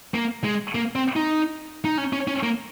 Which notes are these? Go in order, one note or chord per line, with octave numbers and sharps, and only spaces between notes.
A#3
G#3
A#3
C4
D#4
D#4
C#4
C#4
C#4
A#3